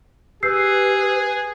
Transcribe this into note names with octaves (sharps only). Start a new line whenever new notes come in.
G4 G#4 B4 E6 G6 C7